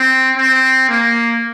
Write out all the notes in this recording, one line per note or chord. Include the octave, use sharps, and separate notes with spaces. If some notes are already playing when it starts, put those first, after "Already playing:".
Already playing: C4
C4
A#3